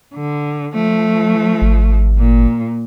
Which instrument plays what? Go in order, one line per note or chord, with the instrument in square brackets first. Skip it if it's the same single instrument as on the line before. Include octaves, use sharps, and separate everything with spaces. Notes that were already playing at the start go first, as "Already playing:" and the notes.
[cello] D3
F3 A3
[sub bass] G#1
[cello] A#2